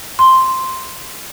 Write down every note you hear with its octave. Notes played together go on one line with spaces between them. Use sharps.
C6